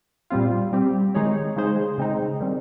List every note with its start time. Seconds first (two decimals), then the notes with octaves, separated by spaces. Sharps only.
0.30 A#2 G3 C4 F4
0.73 G3 C4 G4
1.15 D#3 G#3 D#4 G#4 C#5
1.56 C#3 G#3 D#4 G#4 C5
1.98 C#3 G#3 C4 D#4
2.40 D#3 G3 C4